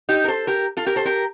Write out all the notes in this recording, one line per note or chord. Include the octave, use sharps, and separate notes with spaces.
D#4 G4
A#4
A4 C5
G4 A#4
F4 A4
G4 A#4
A4 C5
G4 A#4